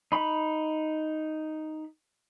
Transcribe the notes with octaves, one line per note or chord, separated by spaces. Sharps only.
D#4 B5